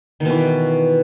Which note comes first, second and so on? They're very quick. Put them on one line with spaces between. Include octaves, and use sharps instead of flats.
D#3 B2 E3